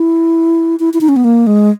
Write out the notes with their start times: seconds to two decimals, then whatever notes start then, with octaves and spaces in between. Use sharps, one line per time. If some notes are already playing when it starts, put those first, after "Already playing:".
Already playing: E4
0.80 E4
0.94 E4
1.01 D#4
1.09 C#4
1.16 B3
1.24 A#3
1.47 G#3